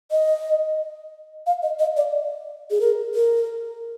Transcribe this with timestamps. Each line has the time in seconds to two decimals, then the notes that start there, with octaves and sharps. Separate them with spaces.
0.11 D#5
1.47 F5
1.62 D#5
1.79 D#5
1.97 D5
2.71 G#4
2.81 A#4
3.15 A#4